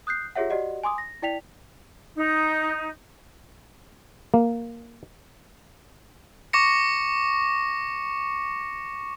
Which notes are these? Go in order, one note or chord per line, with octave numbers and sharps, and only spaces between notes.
D#6 F#6 G6 C7
F4 G4 G#4 C#5 E5 F#5
F#4 G4 D5 D#5 F#5
G#5 C6 D6 D#6
A#6
E4 D5 G5 B6 F7
D#4
A#3
C#6 D6 A#6 C#7